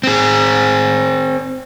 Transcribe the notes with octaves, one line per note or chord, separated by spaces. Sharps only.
C4 G#4